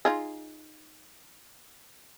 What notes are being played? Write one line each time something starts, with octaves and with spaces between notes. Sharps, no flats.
D#4 F4 G#4